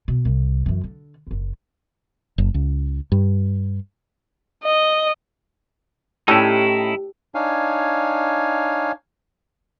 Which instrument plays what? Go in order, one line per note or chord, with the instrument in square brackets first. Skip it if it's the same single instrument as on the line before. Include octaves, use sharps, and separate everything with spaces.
[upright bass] B2
C2
F#2 E3
D3
F#1 D3
[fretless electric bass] F#1
C#2
G2
[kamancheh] D#5
[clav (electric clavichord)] A2 C#4 [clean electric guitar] D#4 E4 [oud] G4 [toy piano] D5 A5 E6
[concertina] D4 D#4 C#5 F5 G#5